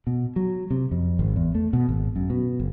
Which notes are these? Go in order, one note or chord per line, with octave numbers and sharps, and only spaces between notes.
B2
F#3
C3
F2
G#1
E2
A3
B2
G#1
F#2
B2
F#1